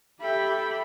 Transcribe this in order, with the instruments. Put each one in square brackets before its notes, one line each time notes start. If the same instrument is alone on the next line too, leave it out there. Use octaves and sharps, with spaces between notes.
[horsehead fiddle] G4 [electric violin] A4 G5 [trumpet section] E5 [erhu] B5